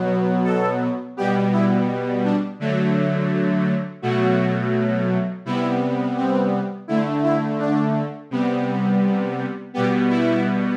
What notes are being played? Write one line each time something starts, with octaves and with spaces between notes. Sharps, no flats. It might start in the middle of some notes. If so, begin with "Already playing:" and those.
Already playing: B2 F#3 B3
A4
B2 G3 B3 G4
E4
D4
D3 F#3 A3
B2 F#3 A3 F#4
C3 G3 B3 E4
C4
D3 A3 E4
E4
D4
C3 G3 B3
B2 G3 B3 G4
E4